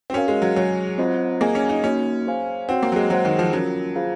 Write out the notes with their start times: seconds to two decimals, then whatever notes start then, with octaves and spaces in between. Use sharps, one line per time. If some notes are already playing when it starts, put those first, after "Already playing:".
0.10 C4
0.13 C#4 F#4 A#4 F5
0.28 G#3
0.42 F#3
0.56 F#3 G#4 C#5 G#5
0.98 C4 F4 C5 D#5 F#5
1.41 A#3 G#4 D#5 G#5
1.55 C#4
1.69 D#4
1.84 A#3 C#4 D#4 F#4
2.26 G#4 C5 F5 G#5
2.69 C4 F#4 C#5 F#5
2.83 A#3
2.92 F#3
2.96 G#3
3.10 F#3 G#4 C5 F#5
3.25 D#3
3.39 F3
3.53 F#3 C#4 F4 A#4
3.96 F4 G#4 C5 F5